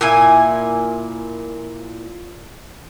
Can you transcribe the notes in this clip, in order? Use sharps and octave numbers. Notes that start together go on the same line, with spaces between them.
A#2 E4 G#5